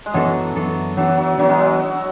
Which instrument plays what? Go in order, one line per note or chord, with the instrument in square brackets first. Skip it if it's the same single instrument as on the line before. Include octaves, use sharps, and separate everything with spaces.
[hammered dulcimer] G#3
[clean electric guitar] F#2 E3 B3 D4 A4 [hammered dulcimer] F#3
[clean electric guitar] F#2 E3 B3 D4 A4
[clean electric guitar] E3 B3 D4 [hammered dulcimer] F#3
[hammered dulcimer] F#3
[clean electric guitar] E3 B3 D4 [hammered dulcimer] F#3
[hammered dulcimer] G#3
F#3